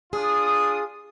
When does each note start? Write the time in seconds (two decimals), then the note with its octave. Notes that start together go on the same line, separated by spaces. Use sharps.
0.13 D4 F4 G#4 D#6